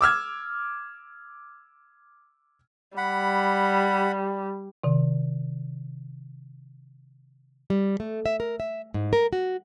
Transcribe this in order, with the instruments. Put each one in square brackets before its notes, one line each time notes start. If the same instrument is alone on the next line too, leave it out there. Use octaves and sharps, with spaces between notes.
[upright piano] D6 E6 F6 G#6
[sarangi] G3 [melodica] F#5 B5
[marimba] C3 D#3
[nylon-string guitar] G3
A3
E5
A#4
E5
G#2
A#4
F#4